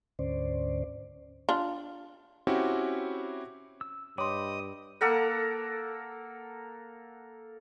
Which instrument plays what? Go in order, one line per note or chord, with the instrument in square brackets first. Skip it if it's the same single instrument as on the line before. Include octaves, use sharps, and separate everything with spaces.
[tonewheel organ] D2 G#2 D3 C#4 C5 D5
[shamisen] D4 F4
[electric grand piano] C4 C#4 E4 F#4 G4
[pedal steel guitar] E6
[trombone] G2 [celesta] C#5 C6 [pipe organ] D#5 D#6 [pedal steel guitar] G5 B5 D6
[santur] A#3 A4 A#4 F#5